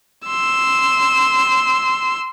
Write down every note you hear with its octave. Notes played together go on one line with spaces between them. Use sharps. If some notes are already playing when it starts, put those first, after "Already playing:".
C6 E6